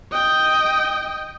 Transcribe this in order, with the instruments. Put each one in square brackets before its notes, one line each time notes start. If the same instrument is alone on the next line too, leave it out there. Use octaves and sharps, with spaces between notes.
[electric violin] D#5 G5